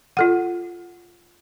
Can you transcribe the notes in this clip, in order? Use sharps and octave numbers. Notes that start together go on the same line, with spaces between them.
F4 A4 F#5